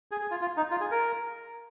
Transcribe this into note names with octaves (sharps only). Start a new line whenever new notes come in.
G#4
G#4
F4
F4
D#4
F4
G#4
A#4